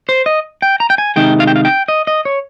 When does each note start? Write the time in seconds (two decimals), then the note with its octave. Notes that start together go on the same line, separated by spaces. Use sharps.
0.09 C5
0.26 D#5
0.62 G5
0.80 A#5
0.90 G5
0.98 G#5
1.16 C3 D#3 G#3 D#4 G5
1.40 F5
1.47 G5
1.56 F5
1.65 G5
1.88 D#5
2.07 D#5
2.25 C#5